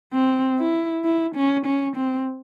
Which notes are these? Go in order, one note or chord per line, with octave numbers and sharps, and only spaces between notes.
C4
E4
E4
C#4
C#4
C4